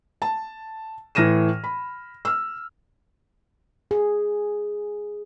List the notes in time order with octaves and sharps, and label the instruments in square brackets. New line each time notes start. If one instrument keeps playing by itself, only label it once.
[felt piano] A5
A2 E3 F6 A#6 D#7 E7
B5
E6 F6
[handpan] G#4